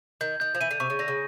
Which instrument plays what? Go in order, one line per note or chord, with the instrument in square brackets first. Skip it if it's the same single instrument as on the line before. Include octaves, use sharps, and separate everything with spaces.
[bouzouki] D#3 [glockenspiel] G6
[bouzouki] D#3 [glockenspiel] G6
[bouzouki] F3
[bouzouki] E3 [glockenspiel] D#7
[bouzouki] D3
[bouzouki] C3 [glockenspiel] C#6
[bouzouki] C#3
[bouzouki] D3 [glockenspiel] A#6
[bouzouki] C#3